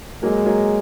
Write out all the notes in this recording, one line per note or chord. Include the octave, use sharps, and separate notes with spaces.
F#3 G#3 A#3
F#3 A#3